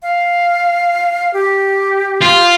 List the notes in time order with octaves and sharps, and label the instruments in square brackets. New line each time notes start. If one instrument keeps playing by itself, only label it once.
[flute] F5
G4
[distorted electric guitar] F4